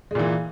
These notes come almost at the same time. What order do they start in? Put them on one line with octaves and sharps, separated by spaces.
G#3 A#2 E3